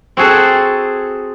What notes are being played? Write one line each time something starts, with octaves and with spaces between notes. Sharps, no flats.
C4 F#4 G#4 A4